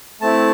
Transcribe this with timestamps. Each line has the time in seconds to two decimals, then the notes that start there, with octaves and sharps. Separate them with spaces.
0.21 A3 C4 E4 A5